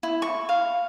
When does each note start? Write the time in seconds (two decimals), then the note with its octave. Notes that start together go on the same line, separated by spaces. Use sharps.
0.03 E4
0.22 C#6
0.49 F5